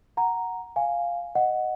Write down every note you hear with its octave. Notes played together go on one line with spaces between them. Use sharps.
F#5 A#5
F5 G#5
D#5 F#5